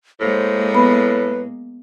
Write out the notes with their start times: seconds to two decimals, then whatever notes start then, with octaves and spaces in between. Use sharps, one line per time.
0.20 A2 G#3 A#3 C5
0.74 B3 B4 B5